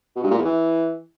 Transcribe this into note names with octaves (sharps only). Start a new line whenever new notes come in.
B2
G2
A#2
E2
E3